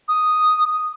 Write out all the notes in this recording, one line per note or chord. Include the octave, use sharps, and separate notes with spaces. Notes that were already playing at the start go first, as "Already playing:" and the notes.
D#6